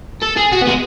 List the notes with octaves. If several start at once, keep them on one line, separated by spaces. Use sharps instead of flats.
A4
G#4
F#4
B3
G#3